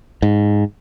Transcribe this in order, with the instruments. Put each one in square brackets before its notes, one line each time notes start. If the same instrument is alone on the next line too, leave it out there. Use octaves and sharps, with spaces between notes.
[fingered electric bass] G#2